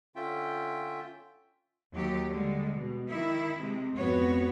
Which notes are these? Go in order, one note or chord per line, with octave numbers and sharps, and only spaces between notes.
D3 C#4 F4 E5 G5
D#2 F#3 G4
D3 G3 G#3
B2
D#3 E4
C3 G#3
F2 G#2 B3 F#4 C#5